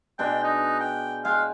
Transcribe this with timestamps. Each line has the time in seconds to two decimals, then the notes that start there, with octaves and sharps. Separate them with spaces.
0.19 B2 G#3 D4 G5
0.44 D#4
0.80 G5
1.25 G#3 F5 G5